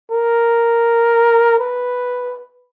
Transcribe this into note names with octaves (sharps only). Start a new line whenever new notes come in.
A#4
B4